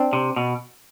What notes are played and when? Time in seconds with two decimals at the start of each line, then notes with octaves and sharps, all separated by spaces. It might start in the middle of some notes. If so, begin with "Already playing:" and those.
Already playing: C4 D4
0.13 C3
0.36 B2